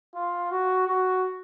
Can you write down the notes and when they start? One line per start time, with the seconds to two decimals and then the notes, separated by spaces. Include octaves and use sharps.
0.15 F4
0.51 F#4
0.87 F#4